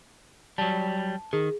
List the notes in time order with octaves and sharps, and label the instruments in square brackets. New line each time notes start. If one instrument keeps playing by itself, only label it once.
[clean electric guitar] F#3 G3 [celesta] A5
[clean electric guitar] D#3 [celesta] G#4